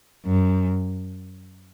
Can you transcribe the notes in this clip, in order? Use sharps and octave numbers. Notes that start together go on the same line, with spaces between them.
F#2